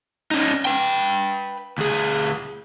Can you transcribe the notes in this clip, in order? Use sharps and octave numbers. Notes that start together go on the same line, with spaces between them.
C#4 D#4
B4 G5
D2 G#4